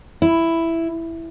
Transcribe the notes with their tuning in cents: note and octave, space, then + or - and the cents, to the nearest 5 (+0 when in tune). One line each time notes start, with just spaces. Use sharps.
E4 +5